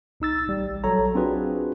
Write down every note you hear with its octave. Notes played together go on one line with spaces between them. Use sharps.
C2 D#4 E6 A6
A1 G3
A#1 F#3 A4 C#5 A#5
C4 D4 F4 F#4 G#4 B4